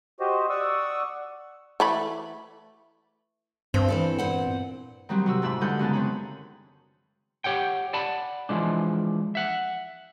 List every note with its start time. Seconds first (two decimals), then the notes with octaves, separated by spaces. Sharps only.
0.20 F#4 G4 C5 D#5
0.50 D5 F#5 C#6 D#6 E6
1.80 E3 A3 B5
3.74 G2 C4
3.88 E3 C4 A4
4.18 A#2 C4 F#5
5.09 D#3 F#3 G3 C4
5.26 C3 F#4 E6
5.42 F2 G#2 E5 B5 E6
5.61 B2 D3 G3 G#3 B5 G6
5.79 F#2 C#3 B3 D#4 A5
5.93 D#3 C4 C#5 B5
7.44 G4 C#5 F#5 G5
7.93 D5 F#5 A5 B5
8.49 E3 F3 G#3 D4
9.35 E5 F#5